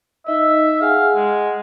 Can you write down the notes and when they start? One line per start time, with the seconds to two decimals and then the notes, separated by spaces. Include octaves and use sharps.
0.27 D#4 D#5 E5
0.81 G#4 F5 F#5 G#5
1.15 G#3